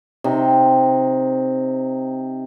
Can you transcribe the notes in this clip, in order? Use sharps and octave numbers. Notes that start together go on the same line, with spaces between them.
C3 D#4